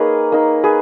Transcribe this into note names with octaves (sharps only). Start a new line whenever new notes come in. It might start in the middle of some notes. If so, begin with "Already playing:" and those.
Already playing: A#3 D#4 G#4 B4 C#5
A#3 D#4
G#4 B4